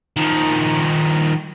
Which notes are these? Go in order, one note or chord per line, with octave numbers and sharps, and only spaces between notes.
D#3 F3